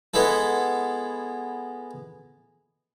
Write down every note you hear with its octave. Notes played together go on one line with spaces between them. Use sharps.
G#3 B3 E4 A4